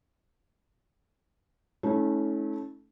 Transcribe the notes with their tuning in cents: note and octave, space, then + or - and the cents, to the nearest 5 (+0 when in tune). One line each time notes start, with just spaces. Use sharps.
A3 -20 C#4 +0 E4 -45